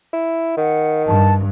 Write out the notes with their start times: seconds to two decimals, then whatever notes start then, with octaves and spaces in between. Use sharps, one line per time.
0.13 E4
0.57 D#3 F#5
1.07 G2 A5